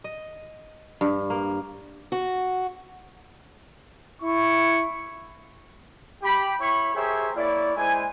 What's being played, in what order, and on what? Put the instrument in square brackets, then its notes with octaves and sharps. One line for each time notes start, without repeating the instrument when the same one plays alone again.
[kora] D#5
G2
A#3
[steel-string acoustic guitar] F#4
[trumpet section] E4 C#6
G4 G5 B5
E4 C#5 B5 C#6
G4 G#4 A#4 C5 C#5 E5
A#3 E4 C#5 D5
G#3 E4 C5 G#5